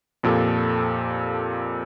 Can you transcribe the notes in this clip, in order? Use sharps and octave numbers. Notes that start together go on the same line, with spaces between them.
F2 A#2 G4 A4